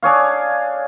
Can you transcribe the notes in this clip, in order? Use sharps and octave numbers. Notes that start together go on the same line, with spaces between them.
D4 G#4 C#5 F5